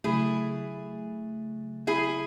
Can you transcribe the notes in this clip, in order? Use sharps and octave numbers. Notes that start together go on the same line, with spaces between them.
C#3 F#3 A3 E4 G#4
E4 G#4